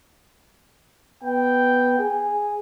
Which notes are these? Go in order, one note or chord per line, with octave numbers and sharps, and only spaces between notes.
B3 G5
G#4